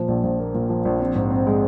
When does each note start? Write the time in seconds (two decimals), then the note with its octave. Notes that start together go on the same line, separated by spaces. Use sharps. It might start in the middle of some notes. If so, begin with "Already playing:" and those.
Already playing: A#2 F3
0.08 A#1
0.23 A#1
0.39 A#3
0.54 A#2
0.69 F3
0.85 A#1
1.00 C4
1.15 G#2
1.30 C4
1.47 G#3